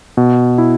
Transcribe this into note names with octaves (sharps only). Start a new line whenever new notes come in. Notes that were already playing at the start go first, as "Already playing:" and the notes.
B2
E4